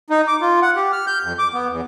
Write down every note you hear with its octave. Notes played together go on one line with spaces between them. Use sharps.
D#4
D6
F4
F#5
G4
F6
G6
F2
D6
B3
E2